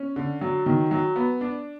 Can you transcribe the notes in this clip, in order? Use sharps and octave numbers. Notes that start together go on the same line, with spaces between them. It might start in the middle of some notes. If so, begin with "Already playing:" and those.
Already playing: C#4
D3
F#3
D#3
F#3
B3
D4